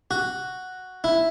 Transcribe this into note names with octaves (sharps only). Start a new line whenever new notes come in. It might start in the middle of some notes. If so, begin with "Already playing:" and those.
F#4
E4